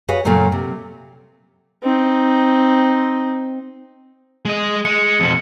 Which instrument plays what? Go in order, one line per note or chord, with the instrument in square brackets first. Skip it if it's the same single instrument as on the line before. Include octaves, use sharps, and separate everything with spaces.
[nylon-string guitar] F#4 G#4 B4 C#5 F5 G#5
F#2 A#2 C#3 F#3 A3 A#3
C3
[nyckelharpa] C4 D#4
[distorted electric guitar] G#3 D#5
[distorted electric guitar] G#3 [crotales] C#7
[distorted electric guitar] F2 B2